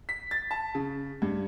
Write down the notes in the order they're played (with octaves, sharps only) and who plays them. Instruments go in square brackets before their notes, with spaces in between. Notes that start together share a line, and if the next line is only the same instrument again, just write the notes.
[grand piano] B6
A6
A5
C#3
G2